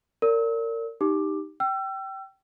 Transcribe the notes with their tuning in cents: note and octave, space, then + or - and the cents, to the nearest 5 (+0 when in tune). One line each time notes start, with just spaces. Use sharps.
A#4 -30 D5 -35 E6 -40
D#4 +0 G4 +0 D6 +10
G5 -20 E6 +35